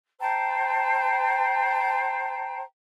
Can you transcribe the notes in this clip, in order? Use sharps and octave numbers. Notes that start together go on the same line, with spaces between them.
C5 G5 A5 A#5